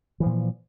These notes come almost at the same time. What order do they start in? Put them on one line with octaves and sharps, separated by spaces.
E3 F3 A#2